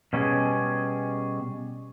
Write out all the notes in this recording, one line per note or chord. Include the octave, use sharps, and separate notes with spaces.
B2 G3 C#4 G#4